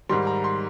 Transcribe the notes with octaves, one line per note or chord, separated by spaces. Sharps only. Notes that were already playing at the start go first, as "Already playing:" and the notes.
G#2 D#3 G3 C6
A#5
C6